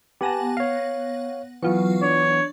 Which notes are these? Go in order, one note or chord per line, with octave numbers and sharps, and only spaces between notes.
B3 G4 F#5 G#5 A5 A#6
C#5 F5
E3 F#3 B3 F4 C#6
D4 C#5